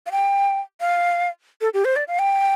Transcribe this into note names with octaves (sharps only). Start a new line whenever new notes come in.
F5
G5
F5
A4
G4
C5
D5
F5
G5